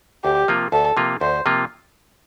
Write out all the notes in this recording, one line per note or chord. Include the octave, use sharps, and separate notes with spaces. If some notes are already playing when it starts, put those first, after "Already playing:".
D2 G4
C3 F3 A#3 F4
D2 A4
C3 F3 A#3 F4
D2 C5
C3 F3 A#3 F4